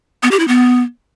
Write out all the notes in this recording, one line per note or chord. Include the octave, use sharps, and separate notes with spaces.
B3
G4
E4
B3